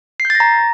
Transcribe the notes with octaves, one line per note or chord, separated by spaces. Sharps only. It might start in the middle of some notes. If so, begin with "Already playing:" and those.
C7
G6
A6
A#6
A#5